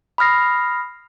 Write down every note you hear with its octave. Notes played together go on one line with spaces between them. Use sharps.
B5 D#6 F6 A#6 C7